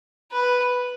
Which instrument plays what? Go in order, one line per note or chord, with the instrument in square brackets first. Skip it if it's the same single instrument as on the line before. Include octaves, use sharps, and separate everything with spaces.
[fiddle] B4